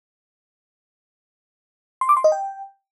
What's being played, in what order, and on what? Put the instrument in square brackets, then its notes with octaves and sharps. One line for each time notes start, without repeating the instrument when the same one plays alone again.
[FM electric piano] C6
D6
C6
D#5
G5